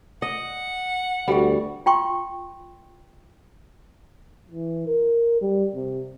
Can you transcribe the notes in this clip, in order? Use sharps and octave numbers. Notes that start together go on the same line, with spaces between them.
D#5 F#5
D2 G3 B3 F#4
F4 G5 C6 C#6
E3
A#4
G3
C3